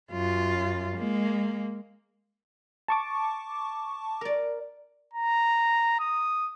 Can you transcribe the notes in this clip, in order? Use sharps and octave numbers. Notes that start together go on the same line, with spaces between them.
F#2 F4
G#3 A#3
A5 C#6 D6
A#4 D5
A#5
D#6